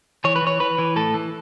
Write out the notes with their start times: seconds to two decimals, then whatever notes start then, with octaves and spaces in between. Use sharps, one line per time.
0.24 E3 C#5
0.36 B4
0.42 E3 C#5
0.60 E3 B4
0.78 E3
0.96 A2 A4
1.14 E3